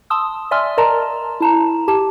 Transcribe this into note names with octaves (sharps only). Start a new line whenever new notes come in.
A5 C6 D#6 E6
D5 E5 G#5 C6 E6 F6
A#4 D5 D#5 A5 A#5 C6
E4 A5 A#5
G4 A5